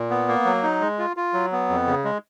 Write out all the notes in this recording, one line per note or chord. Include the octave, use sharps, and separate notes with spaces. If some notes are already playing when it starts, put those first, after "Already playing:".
Already playing: A#2
B3
A#3
F#3
D#4
G#3
F4
F4
F#3
B3
F2
C#3
G#3